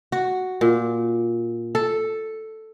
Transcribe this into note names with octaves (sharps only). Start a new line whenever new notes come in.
F#4
A#2
A4